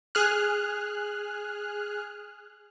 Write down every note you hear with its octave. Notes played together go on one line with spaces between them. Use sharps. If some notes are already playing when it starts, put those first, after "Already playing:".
G#4 F6 F#6